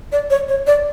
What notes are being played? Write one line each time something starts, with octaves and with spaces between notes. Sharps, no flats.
D5
C#5
C#5
D5